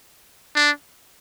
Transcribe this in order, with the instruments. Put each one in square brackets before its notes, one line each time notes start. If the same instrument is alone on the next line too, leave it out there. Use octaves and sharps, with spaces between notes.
[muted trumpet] D4